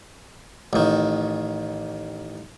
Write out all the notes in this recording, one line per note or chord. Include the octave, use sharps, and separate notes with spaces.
A1 D#3